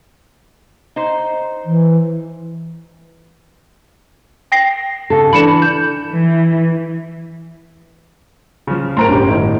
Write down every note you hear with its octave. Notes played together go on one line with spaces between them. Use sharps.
D#4 C5
E3
G5 A#6 C7
C#3 A4
E3 D4 A4 B5 C#7 E7
G6
E3
C#3 F3
A2 A#4 C5 A#5 C6 D7
G1 C#4 G4
A2 D#3 E4